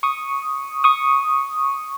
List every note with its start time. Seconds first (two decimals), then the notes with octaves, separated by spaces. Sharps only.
0.03 C#6 D#6
0.84 C#6 D#6